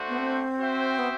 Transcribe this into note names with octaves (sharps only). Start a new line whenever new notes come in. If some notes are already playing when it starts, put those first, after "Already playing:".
Already playing: A3 D4 F#4 C5
B3
C4
F#4 C5 E5 G5
B3